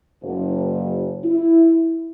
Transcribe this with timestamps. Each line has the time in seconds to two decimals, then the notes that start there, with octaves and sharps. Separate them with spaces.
0.22 F#1
1.24 E4